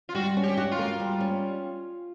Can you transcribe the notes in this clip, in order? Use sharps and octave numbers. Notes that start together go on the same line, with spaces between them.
F4
G3 F#4
C#4
G4
F#4
F4
A#3
G3
C#4